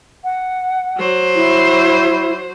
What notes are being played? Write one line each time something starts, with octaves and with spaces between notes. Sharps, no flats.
F#5
F#3 C5
E4